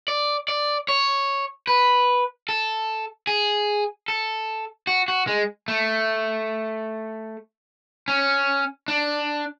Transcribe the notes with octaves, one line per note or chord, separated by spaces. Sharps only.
D5
D5
C#5
B4
A4
G#4
A4
F#4
F#4
G#3
A3
C#4
D4